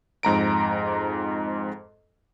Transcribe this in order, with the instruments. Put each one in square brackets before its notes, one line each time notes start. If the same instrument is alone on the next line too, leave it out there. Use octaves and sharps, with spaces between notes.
[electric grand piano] F2 G#2 A#5 D7